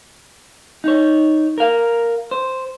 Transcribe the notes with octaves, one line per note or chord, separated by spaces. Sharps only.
D#4 C#5
A#4 F5
C5